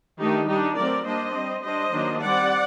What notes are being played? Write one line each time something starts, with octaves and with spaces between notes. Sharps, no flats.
D#3 A3 D4 D#4 G4
G3 D4 D#4 G4
F#3 A3 C4 A#4 D5
G3 A#3 D4 C5 D#5
G3 C4
G3 D4 C5 D#5
D#3 F#3 A#3 D4
G3 C4 D5 F#5